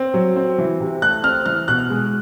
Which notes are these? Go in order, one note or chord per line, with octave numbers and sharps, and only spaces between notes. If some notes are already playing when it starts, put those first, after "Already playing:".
Already playing: C4
F#3
C4
E3
C3
A3 F#6
C4 F6
E3 F6
B2 F#6
G#3